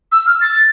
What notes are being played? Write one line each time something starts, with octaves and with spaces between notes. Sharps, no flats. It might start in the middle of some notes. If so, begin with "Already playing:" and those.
E6
F6
A6